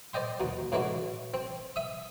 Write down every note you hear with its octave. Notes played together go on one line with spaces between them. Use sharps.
C5 D5 D#5 G5 C6
D#2 B2
A2 C#3 E3 G#3 D4 F#4
C4
E5 D#6